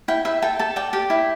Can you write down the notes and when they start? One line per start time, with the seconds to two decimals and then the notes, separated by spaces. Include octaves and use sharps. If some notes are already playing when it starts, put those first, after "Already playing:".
0.08 E4 G5
0.25 E4 E5
0.42 A4 G5
0.59 A4 A5
0.76 D5 G5
0.93 G4 G5
1.10 E4